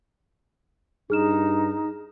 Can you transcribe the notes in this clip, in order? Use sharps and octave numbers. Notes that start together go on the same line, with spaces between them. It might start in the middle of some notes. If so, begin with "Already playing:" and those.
G2 D#4 G#4 F6 E7